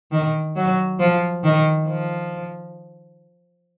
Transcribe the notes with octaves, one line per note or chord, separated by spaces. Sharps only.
D#3
F#3
F3
D#3
F3